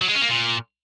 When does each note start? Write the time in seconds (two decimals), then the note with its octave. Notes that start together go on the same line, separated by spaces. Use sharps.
0.01 F#3
0.08 G#3
0.15 C#4
0.22 A#3
0.28 A#2